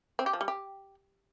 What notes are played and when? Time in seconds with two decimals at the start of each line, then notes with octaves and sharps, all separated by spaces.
0.19 C4
0.26 G4
0.33 F3
0.41 G3
0.48 G4